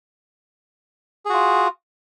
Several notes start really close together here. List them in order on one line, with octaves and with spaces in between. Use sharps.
G#4 F#4 F4